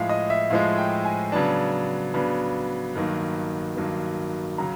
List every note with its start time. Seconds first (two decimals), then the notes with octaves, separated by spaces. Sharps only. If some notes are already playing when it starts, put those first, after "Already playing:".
Already playing: A2 F3 G#3 E5 F5
0.09 D#5
0.30 E5
0.50 A2 F3 G#3 F5
0.78 G5
1.05 G#5
1.32 C#3 F#3 B3 D4 A5
2.14 C#3 F#3 B3 D4
2.95 G2 D#3 F#3 A#3
3.77 G2 D#3 F#3 A#3
4.58 C#3 F#3 A#5